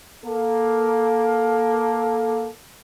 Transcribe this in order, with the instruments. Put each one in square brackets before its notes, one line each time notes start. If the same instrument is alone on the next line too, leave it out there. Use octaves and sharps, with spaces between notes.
[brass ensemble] A#3 A4